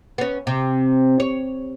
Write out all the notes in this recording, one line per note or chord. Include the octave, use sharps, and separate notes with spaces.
B3 C#4
C3
C#5